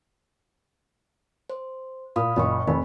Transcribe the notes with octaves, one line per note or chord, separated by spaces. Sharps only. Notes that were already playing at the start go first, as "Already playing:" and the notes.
C5
A#2 F5 B5 D#6
F#1 A#2 D#5 G5 C#6
F1 B5